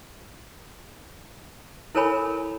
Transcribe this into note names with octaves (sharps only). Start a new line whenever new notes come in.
E4 A4 A#4 C#5 G#5 B5